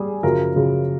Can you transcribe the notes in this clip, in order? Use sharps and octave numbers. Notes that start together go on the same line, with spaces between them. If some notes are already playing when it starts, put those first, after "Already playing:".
Already playing: G3 G#4
F#2 C#3 F3 A#4
F#2 C#3 F3